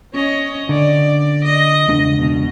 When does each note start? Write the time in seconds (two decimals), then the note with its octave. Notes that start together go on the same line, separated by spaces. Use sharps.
0.13 C#4 C#5 D#5
0.69 D3 D5
1.45 D#5
1.88 E1 C#2 D4
2.19 B2